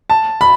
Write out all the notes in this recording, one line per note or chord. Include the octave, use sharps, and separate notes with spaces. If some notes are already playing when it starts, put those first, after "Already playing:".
A5
B5